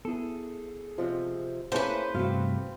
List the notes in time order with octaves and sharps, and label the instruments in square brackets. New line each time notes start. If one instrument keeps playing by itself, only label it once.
[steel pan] B3 E4 [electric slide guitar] G#4 A4
[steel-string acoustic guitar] C3 F3 [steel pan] F4 C5 D#5
[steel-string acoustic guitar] A3 A#3 C#4 [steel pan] E4 G#4 F#5 [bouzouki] B4 C5
[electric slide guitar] G2 C3 A3 [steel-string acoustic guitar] C4 F5 [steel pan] F#4